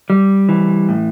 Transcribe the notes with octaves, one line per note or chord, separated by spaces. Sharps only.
G3
E3
A2